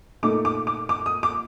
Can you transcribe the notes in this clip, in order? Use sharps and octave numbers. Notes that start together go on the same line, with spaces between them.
A#2 A3 D#4 D6
D6
D6
D6
D#6
D6